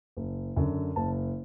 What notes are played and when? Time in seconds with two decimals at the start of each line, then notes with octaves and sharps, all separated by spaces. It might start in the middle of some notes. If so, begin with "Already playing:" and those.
0.17 F#1
0.56 F#2 D3
0.96 F#1 A5